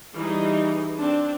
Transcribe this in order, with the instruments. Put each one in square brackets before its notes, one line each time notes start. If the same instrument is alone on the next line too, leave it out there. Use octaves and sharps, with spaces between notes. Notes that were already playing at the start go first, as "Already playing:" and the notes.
[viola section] E3 G3 D#4 G#4
C4 D4